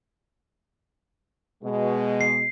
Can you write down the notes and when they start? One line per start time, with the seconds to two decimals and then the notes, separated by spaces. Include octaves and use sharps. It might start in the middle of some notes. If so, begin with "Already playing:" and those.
1.64 B2 G#3
2.21 C7